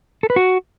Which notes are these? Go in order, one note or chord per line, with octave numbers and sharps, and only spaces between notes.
A4
B4
F#4